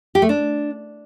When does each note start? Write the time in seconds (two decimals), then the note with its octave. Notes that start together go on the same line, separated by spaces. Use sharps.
0.15 G4
0.22 A3
0.29 D4